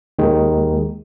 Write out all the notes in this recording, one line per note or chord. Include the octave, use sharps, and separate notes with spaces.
D#2 D#3 G#3